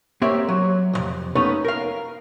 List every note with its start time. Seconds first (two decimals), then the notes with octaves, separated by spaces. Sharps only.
0.22 A#3 C4 G4 C#5 D5 E5
0.49 F#3
0.93 C2 F2 C3
1.35 A3 B3 C#4 D#4
1.65 A#4 F5